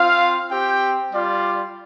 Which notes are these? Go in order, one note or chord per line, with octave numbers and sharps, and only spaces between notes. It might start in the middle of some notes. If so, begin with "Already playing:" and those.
Already playing: C4 F4 F5
C4 G4 G5
G3 F4 D5